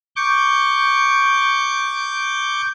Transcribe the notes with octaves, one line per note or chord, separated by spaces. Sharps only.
C#6 D6 G6